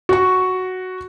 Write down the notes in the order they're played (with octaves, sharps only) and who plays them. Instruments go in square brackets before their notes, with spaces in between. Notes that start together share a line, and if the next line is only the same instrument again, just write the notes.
[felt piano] F#4 C#6